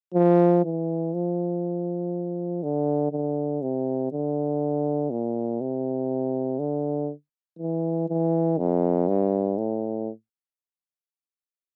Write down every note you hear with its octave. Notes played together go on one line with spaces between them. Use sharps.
F3
E3
F3
D3
D3
C3
D3
A#2
C3
D3
E3
E3
F2
G2
A2